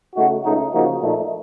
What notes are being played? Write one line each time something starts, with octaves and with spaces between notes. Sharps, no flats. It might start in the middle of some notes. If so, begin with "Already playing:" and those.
C#3 A3 D#4 F#4
C#2 C#3 A3 D#4
C#3 F3 A#3 D#4 F#4
A#2 F3 A3 D#4